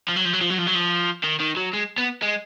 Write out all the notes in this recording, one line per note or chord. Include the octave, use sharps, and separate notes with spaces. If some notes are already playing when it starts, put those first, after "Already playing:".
F3
F#3
F3
F#3
F3
F#3
F3
F#3
F3
D#3
D#3
F#3
G#3
B3
G#3